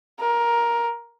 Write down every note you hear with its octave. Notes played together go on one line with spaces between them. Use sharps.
A#4